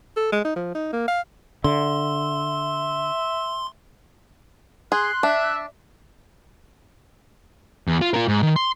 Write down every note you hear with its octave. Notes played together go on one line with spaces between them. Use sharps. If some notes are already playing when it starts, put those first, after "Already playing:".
A4
G#3
D#4
F3
D#4
A#3
F5
D3 E5 C6
G#4 C6 F#6
D4 E5
E2
F4
F4 A#4
G#2
D#3
C6